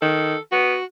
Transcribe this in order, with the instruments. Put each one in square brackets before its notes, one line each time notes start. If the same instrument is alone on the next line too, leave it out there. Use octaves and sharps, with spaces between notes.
[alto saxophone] D#3 [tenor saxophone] A4
[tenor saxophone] B3 [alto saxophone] F#4